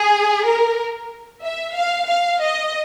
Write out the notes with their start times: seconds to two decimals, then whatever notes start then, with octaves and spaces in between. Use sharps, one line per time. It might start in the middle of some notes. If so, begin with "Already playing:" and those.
Already playing: G#4
0.46 A#4
1.44 E5
1.76 F5
2.09 F5
2.42 D#5